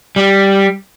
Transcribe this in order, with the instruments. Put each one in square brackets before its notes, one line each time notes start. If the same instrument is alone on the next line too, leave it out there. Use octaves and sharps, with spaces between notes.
[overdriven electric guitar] G3